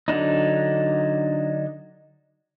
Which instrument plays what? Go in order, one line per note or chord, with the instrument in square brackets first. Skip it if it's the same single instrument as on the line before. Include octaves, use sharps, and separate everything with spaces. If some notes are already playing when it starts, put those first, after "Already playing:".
[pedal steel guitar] D3 F#3 D4 D#4